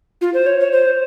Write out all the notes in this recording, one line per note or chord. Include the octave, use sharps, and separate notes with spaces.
F4
C5
C#5
C#5
C5